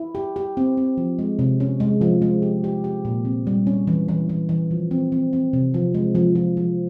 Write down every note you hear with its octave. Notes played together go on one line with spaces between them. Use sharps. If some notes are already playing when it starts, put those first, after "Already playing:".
Already playing: E4
G4
G4
C4
C4
F3
G#3
C3
C#4
G#3
F3
G#3
G4
G4
G4
A#2
C4
G3
C#4
E3
E3
E3
E3
F3
C4
C4
C4
C3
F3
G#3
F3
F3
F3